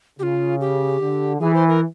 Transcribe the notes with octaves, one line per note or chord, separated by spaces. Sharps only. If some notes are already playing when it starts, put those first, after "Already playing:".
C#3 F4 G4
G4
D3
E3 G#4
C5
A#4